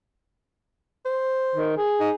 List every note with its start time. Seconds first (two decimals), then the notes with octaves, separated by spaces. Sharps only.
1.05 C5
1.55 D#3
1.77 G#4
2.00 D#4